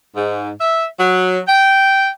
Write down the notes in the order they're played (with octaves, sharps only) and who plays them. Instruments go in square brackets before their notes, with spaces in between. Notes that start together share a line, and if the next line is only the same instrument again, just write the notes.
[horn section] G#2
E5
F#3
G5